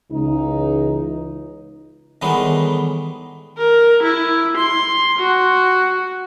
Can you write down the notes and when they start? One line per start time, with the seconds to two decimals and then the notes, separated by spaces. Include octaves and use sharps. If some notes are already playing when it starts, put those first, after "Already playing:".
0.11 C#2 E3 D#4
2.22 A2 D#3 E3 G3 G#3 B3
3.58 A#4
4.03 E4
4.57 C6
5.19 F#4